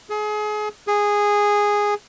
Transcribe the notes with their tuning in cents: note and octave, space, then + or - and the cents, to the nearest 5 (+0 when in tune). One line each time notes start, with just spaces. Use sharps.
G#4 +30
G#4 -10